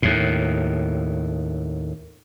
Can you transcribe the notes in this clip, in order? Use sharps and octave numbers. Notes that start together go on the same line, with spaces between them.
D#2 A2